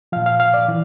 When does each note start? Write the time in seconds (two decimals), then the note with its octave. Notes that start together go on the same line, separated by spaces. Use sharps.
0.12 A#2 F3 F5
0.26 F5
0.40 F5
0.54 D5
0.68 E3